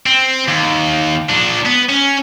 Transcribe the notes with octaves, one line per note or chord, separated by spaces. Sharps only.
C4
D#2
A#2 D4
B3
C#4